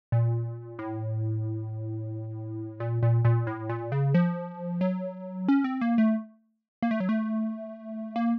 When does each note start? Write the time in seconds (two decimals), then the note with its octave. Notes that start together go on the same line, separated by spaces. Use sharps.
0.12 A#2
0.79 A2
2.80 A#2
3.03 A#2
3.25 A#2
3.47 A2
3.69 A#2
3.92 C#3
4.15 F3
4.81 F#3
5.48 C#4
5.64 C4
5.81 A#3
5.98 A3
6.82 A#3
6.91 A3
7.00 F#3
7.09 A3
8.16 A#3